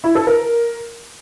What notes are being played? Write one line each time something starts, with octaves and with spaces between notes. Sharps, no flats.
E4
A4
A#4